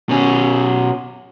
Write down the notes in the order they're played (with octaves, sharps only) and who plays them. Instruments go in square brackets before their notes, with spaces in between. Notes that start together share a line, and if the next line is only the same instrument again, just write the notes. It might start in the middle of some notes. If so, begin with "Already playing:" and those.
[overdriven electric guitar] B2 C#4